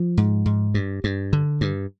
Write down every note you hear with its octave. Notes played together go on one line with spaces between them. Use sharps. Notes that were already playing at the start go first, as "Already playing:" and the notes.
Already playing: F3
G#2
G#2
G2
G2
D3
G2